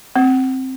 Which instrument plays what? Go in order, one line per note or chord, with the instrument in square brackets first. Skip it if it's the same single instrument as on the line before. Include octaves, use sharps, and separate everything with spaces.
[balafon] C4